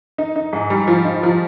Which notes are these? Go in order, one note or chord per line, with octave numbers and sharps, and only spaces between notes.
D#4
D#4
G#2
G3
F3
D#4
F3